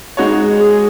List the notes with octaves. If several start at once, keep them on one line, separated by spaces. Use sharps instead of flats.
G#3 D#4 F#4 C#5
G#4
G#4